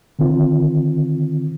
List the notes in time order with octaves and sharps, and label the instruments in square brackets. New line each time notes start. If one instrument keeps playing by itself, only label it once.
[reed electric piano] D3 D#3 C4 F4